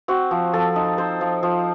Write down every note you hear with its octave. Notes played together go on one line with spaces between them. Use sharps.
C4 F#4
F3
F3 A4
D#4
C4 C5
F3
F3